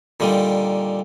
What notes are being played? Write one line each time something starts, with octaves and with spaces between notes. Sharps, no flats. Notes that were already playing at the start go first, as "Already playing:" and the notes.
A#2 D3 D#3 G3